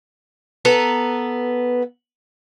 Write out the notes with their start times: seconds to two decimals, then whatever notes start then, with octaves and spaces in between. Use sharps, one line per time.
0.65 B3 A4 B4 A#5